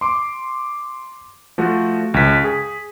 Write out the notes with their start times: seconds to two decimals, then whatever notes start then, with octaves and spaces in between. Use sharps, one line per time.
0.01 C6 D6
1.58 F3 A3 F#4
2.14 C#2 B6
2.44 G#4